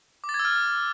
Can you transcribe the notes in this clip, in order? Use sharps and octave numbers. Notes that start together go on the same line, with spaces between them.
D6
A6
G#6
E6
F6